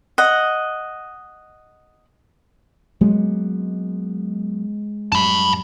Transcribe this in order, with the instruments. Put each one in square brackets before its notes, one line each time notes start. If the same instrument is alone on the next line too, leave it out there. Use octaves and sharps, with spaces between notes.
[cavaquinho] D#5 F#5
[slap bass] F#3 A#3 B3 [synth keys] G#3
[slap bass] F#2 G3 [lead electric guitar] A5 B5